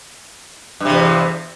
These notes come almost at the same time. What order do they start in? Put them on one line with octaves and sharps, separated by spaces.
G2 C3 E2